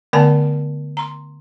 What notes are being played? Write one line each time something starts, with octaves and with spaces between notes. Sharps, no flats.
D3 A3 B3 D5 G#5 A5
A#5 C6